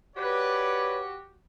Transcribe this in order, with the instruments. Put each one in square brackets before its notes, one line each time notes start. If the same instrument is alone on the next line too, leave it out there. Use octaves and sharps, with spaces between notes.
[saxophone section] F#4 G4 [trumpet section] B4 C#5 D5